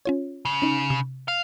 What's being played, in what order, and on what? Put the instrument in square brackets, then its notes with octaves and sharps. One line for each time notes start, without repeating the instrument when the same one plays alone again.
[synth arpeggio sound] C#4 F4 C#5
[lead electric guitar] C#3
[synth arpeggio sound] C#4 D#4
C3
[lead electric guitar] F5